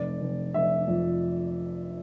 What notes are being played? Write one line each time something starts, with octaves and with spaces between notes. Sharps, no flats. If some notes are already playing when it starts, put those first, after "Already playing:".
Already playing: F1 D5
F1
F1 E5
F2